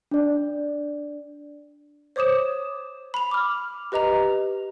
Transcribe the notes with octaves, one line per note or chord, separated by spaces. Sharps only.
D4 D5
C5 C#5 D6 D#6 E7
B5 F7
D6 F6
G4 B4 D#5 A#5 F7